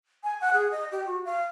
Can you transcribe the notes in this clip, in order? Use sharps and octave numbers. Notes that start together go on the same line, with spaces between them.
G#5
F#5
G#4
D#5
G4
F#4
F5